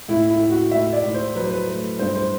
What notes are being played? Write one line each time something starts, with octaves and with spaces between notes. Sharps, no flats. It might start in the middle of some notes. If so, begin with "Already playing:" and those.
A2 E4
E4
A2
F#4
A2 E5
D5
A2
C5
F#3 B4
C5
B4
A3
G2 C5
C5